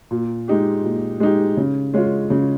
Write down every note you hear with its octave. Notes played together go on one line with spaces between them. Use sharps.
A#2
G#3 D#4 G4
A#2
G#3 D#4 G4
C#3
G#3 C#4 F4
C#3